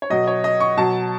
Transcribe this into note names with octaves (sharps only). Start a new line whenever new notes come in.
C#5
B2 F#3 D#5
C#5
D#5
C#6
B2 F#3 A5